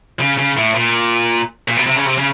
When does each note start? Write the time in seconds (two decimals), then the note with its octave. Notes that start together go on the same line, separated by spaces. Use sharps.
0.20 C#3
0.38 C#3
0.57 A2
0.75 A#2
1.68 A#2
1.77 B2
1.87 C3
1.96 C#3
2.05 C3
2.18 C#3